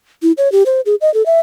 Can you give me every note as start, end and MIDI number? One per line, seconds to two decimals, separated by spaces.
0.23 0.32 64
0.38 0.51 73
0.52 0.63 67
0.66 0.81 72
0.86 0.95 68
1.01 1.13 75
1.14 1.25 69
1.26 1.40 76